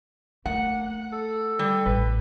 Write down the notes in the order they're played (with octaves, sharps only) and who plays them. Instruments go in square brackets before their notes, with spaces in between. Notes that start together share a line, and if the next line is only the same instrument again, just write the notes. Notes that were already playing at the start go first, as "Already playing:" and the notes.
[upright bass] A3 [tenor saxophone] A#3 [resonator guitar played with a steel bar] F#5
[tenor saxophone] A4
[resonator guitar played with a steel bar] G3
[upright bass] A1 [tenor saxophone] B4